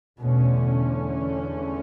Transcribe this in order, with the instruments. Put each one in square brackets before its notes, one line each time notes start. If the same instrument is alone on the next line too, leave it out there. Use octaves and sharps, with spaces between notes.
[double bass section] E2 D3 A3 C#4 [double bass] B2